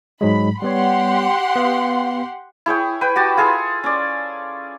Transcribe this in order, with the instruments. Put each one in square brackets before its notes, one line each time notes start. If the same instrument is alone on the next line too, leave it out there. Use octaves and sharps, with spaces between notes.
[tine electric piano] G#2 F#3 G#3 [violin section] B5
[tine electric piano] G3 B3 C#5 [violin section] G4 F#5 C6
[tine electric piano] B3 F5
[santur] E4 G#4 C#5 G5
B4 G5
F#4 G4 A5
F4 G#4 A4 C6
C#4 D5